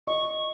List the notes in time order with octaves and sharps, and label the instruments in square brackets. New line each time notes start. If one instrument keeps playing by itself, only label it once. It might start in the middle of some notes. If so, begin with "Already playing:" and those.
[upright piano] D#5 [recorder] C#6